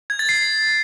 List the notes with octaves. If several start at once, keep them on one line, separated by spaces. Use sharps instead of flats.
G#6
A6
C7